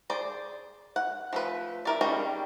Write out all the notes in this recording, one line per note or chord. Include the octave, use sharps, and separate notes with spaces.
G#4 C5 D5
F#5
F3 A3 B4
E4 A#4 D5
D#3 G3 C#4 G#4 A#5